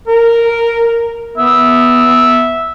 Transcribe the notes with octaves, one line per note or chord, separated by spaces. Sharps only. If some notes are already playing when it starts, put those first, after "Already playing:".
A#4
B3 E5